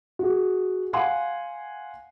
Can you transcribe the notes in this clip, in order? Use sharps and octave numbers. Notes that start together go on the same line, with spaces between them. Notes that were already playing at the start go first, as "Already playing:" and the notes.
F#4 G#4
F5 F#5 G#5 C6